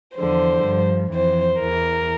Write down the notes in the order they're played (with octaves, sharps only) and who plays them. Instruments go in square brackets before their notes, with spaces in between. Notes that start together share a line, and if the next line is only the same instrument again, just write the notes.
[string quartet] E2 D3 F3 C5
G2 F3
F2 E3 C5
E2 E3 A#4